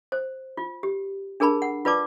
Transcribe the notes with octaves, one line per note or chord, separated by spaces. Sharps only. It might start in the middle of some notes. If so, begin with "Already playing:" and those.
C5
F4
G4
D4 G#4 A#4 A5 B5
F#5
F4 B4 D5 A5 D6